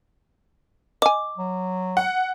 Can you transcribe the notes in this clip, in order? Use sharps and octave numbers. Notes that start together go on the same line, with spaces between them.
D#5 G#5 D6
F#3
F#5